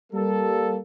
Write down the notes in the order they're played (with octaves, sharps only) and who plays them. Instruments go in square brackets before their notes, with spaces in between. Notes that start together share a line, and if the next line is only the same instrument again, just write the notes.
[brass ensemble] G3 A#3 A4